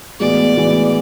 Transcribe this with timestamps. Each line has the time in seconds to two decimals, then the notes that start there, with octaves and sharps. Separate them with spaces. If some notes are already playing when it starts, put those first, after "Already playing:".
0.20 A2 E3 G#3 B3 F#4 D5
0.56 A2 E3 G#3 B3 F#4